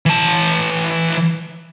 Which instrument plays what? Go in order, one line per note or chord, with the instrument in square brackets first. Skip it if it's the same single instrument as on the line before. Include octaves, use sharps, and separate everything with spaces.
[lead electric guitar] E3 A5